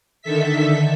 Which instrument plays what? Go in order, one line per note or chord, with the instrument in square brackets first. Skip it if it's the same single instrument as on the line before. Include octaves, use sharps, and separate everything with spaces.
[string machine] D3 D#3 A4 E5 B6